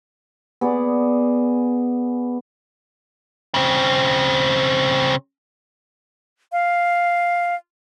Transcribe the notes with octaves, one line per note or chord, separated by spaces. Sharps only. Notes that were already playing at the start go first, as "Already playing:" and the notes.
B3 G#4 D5
C#3 C4
F5